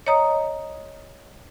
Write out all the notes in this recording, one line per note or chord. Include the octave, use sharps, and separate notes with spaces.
C#5 D#5 A#5 D#6